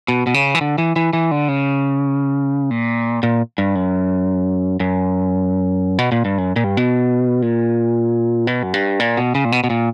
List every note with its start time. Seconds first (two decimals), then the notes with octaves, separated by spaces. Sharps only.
0.08 B2
0.27 B2
0.34 C#3
0.55 E3
0.61 D3
0.78 E3
0.96 E3
1.13 E3
1.31 D3
1.48 C#3
2.71 A#2
3.23 A#2
3.58 G2
3.75 F#2
4.80 F#2
5.98 B2
6.12 A#2
6.25 G2
6.38 F#2
6.56 A#2
6.64 G2
6.77 B2
7.42 A#2
8.47 B2
8.63 F#2
8.74 G2
9.00 A#2
9.17 B2
9.35 C#3
9.45 A#2
9.52 B2
9.64 B2
9.70 A#2